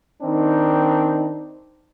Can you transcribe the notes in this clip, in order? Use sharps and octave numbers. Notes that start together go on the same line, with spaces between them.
D#3 C4 D4 D#4